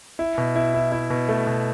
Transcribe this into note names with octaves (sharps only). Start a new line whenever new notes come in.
E4
B2
E4
E4
E4
B2
A3
B2